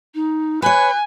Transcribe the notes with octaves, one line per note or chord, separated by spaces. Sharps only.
D#4
B4 C#5 G#5 F#6